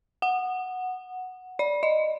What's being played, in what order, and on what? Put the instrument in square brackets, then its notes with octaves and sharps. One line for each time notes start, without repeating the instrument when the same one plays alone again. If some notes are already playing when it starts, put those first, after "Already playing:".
[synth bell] F#5
D5
D#5